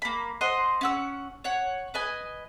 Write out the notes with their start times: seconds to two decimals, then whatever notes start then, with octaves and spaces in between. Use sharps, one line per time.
0.02 A#3 B5
0.41 C5 D#5 F#5 C6
0.81 C#4 F#5 E6
1.44 C#5 F#5
1.94 B4 D#5 G#5